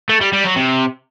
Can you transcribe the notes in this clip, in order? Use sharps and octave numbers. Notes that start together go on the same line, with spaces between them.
A3
G3
G3
F#3
C3